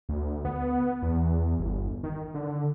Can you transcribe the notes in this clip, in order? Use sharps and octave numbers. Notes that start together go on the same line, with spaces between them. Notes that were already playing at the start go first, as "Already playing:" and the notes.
D2
B3
E2
G1
D#3
D3